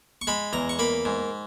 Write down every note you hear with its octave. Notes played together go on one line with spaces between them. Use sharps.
C#6
G#3 B5
E2 A#5
C#6
A#3 B5
G#2